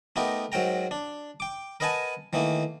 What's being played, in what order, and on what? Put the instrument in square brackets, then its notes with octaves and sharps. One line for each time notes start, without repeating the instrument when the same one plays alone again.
[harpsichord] A3 B3 D#4 G4 A#4
G#2 F#3 A#4 G5 A#5
D4
G5 D6
A#4 B4 D#5 F#5 G#5 A5
D#3 E3 A3 A#3 D#4